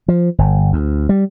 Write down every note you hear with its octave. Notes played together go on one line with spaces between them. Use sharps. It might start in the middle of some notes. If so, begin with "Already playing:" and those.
F3
G1
D2
G3